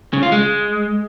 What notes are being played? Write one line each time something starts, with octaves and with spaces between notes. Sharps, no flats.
C#3
F4
G#3